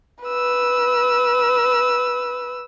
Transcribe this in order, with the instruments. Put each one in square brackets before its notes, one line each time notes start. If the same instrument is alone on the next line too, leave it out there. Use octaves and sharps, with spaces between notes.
[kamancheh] B4 E6